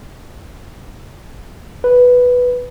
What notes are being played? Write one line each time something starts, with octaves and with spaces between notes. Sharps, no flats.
B4